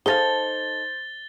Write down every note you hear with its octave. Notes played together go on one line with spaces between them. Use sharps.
D#4 G#4 A4 C5 D#5 F5 A6 G7